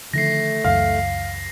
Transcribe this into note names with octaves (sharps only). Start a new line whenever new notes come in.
D3 D#3 F3 A3 A#6 C7
C#2 F#2 E3 F5